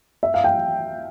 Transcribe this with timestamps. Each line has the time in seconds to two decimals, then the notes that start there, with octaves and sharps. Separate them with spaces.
0.23 E5
0.34 F5
0.44 G5